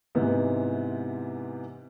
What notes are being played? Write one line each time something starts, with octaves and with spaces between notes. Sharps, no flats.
G#2 C3 E3 B3